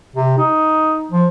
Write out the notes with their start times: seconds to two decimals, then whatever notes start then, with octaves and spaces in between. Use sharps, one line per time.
0.16 C3
0.38 D#4
1.11 F3